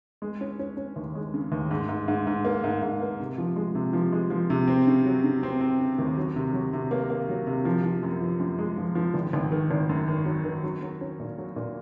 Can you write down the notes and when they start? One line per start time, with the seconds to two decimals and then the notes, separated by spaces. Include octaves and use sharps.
0.22 G#3
0.41 C#4
0.59 C#4
0.77 C#4
0.96 D#2
1.15 G#3
1.34 C#3
1.52 D#2
1.71 G#2
1.88 G#2
2.08 G#2
2.27 G#2
2.45 A#3
2.64 G#2
2.83 G#2
3.01 A#3
3.19 C3
3.38 F3
3.56 G#3
3.75 C3
3.93 F3
4.12 G#3
4.30 F3
4.50 C3
4.67 C4
4.87 C#3
5.06 F#3
5.24 C#3
5.43 C4
5.61 C4
5.79 C#3
5.99 D#2
6.17 F#3
6.36 C3
6.53 F#3
6.73 C3
6.91 A#3
7.10 A#3
7.29 F#3
7.47 C3
7.65 F3
7.84 F3
8.03 F#2
8.22 F3
8.40 F#2
8.59 G#3
8.78 F3
8.95 F3
9.14 G#1
9.33 G#1
9.51 D#3
9.71 G#1
9.89 F#2
10.08 D#3
10.25 F#3
10.44 D#3
10.64 F#3
10.81 F#3
11.01 C#4
11.20 A#2
11.38 F#3
11.56 A#2